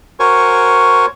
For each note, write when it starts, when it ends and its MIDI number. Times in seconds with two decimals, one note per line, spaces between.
0.20 1.06 66
0.20 1.06 70
0.20 1.06 72
0.20 1.06 73
0.20 1.06 80
0.20 1.06 85